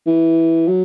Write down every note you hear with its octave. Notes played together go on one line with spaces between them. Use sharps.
E3
F#3